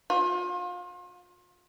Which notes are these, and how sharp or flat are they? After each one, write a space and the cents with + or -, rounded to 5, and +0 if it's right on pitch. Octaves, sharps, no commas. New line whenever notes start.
F4 +35